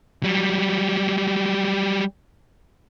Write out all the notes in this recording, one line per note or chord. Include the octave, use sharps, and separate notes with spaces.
F#3 G3